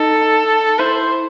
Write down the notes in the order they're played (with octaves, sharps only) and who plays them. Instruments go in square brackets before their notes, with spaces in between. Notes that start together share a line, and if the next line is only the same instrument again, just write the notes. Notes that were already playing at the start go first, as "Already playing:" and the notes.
Already playing: [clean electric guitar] D#4 [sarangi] A4
[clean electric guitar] E4 [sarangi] C5